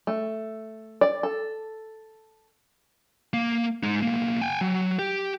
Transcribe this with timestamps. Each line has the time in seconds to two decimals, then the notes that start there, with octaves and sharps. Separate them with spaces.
0.07 A3
1.01 D5
1.23 A4
3.33 A#3
3.83 G#3 D#4
4.02 B1 A#3
4.41 G5 G#5
4.61 F#3
4.99 G4